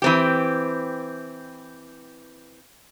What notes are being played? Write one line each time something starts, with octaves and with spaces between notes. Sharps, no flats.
E3 C4 G4